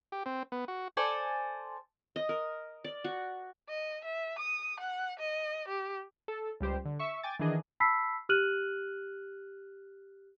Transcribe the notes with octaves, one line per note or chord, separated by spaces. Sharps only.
G4
C4
B3
F#4
A4 C5 D5 G#5
D#5
A#4
D5
F#4
D#5
E5
D#6
F#5
D#5
G4
A4
C#2 G3 G4 C5
D3
E5 C#6
G5 G#5 D6 A6
D#3 E3 D4 G#4 D#5
A5 B5 E6 B6 C7
G4 F6 F#6 D#7 F#7